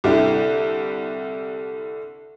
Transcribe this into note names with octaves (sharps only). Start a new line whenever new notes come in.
C2 D3 E4 G4